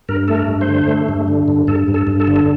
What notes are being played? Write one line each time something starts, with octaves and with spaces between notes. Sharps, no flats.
G2 A#4
A3 A4
A#4
G2
C5
D3
A3
G2
D3
G2
G2 A4
G2
A4
G2
A4
D3
A4